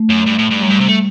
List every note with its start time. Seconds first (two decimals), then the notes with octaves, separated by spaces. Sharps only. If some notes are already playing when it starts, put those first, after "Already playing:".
Already playing: A3
0.10 F#2
0.26 G2
0.39 A2
0.51 G2
0.61 F#2 G3
0.70 G2
0.80 C3
0.88 A3